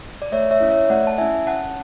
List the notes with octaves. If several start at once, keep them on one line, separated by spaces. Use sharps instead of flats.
D5
A3 C#5 E5
C#5 E5
C#4 E4
C#5 E5
A3 D5 F#5
A5
C#4 E4 E5 G#5
C#4 F#5 A5